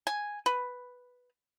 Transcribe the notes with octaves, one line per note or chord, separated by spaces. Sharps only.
G#5
B4